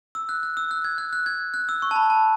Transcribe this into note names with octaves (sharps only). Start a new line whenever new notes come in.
E6
F#6
F#6
E6
F#6
G#6
F#6
F#6
G#6
F#6
E6
C#6
A5
B5
A5